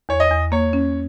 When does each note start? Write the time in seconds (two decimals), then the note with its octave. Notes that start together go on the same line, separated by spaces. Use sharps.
0.09 E2 C#5
0.20 D#5
0.31 E2
0.52 A#3 C#5
0.73 C#4